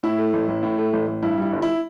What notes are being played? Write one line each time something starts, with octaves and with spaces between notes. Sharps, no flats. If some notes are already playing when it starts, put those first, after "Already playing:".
A2 E4
A3
A1
A1
A2
A3
A1
A1
G2 E4
G3 E4
G1
E4